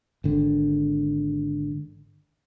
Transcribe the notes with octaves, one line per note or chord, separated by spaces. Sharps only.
G#1 D3